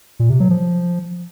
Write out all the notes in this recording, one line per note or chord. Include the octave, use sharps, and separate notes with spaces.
A#2
C3
F#3
F3